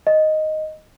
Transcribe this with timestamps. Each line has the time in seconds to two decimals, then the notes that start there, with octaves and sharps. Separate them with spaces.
0.07 D#5